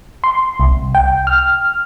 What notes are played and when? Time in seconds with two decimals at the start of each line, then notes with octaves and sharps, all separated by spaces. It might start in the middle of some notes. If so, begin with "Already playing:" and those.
0.24 C6
0.60 C2
0.95 G5
1.27 F6